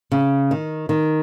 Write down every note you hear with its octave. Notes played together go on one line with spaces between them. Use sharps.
C#3
D#3
D#3